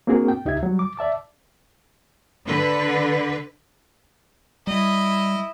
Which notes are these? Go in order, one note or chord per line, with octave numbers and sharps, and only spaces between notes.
A#3 C4 D4 F#4 G#4 A#4
G5
C#2 D#4 G4 E5 G#6
F#3 G3
D6
D5 E5 A5 D6
D3 B4
G3 E4 D#5